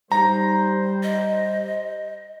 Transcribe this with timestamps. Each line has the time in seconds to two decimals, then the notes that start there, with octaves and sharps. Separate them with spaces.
0.12 G3 D#4 C5 A#5
1.03 D#5